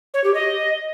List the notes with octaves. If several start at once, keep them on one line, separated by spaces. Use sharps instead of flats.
C#5
G4
D#5